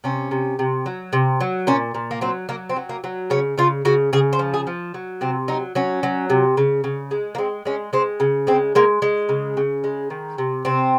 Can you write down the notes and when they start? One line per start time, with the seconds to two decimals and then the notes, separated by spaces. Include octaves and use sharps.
0.04 C3 C#4
0.31 C3
0.59 C3
0.86 F#3
1.13 C3
1.40 F#3
1.67 A#2 C#4
1.94 A#2
2.11 A#3
2.21 F#3 C4
2.49 F#3 A#3
2.69 C4
2.76 F#3
2.89 A#3
3.04 F#3
3.30 C#3 C#4
3.58 C#3 F4
3.85 C#3 F#4
4.13 C#3 G#4
4.33 C5
4.39 F3
4.54 G#4
4.67 F3
4.94 F#3
5.21 C3 C4
5.48 F#3 D#4
5.75 F#3 C#4
6.03 F#3
6.30 C3
6.57 C#3
6.84 C#3
7.11 G#3
7.35 A#3
7.38 G#3 C4
7.65 G#3 C#4
7.93 G#3 C4
8.20 C#3
8.47 G#3 C4
8.75 G#3 A#3
9.02 G#3
9.29 C#3
9.57 C#3
9.84 G#3
10.10 D#3
10.38 C3
10.65 C3 C4